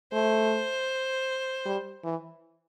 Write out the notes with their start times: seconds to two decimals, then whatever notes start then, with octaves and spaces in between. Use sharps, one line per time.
0.13 A3 C5
1.65 G3
2.04 E3